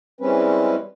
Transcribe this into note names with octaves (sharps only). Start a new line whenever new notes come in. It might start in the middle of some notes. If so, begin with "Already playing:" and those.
E3 G3 G#3 C4 C#4 B4